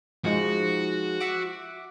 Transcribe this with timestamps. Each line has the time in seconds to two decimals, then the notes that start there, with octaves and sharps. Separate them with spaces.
0.24 F3 G#3 D#4 F#4
1.20 E5 F#5 D6